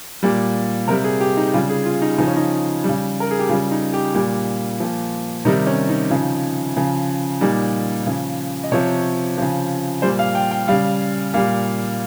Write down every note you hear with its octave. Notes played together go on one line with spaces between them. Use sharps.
A#2 G3
C3 G3 A#4
G#4
G4
D#4
C#3 G3 F4
G#4
F4
D#4
C#3 F3 D#4
C#4
D#4
C#3 G3
A#4
G#4
G4
C#3 G3 F4
D#4
G4
A#2 G3
A#2 F3
C3 D#3 G3 D#4
C#4
D#4
C#3 F3
C#3 F3
A#2 G3 D#4
C#3 F3
D#5
C3 F3 C#5
C#3 F3
A#2 G3 C5
F5
G5
G5
C#3 G3 F5
A#2 G3 F5